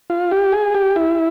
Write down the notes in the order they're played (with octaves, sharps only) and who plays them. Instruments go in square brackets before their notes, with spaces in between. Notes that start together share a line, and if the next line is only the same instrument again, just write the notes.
[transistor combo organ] F4
G4
G#4
G4
E4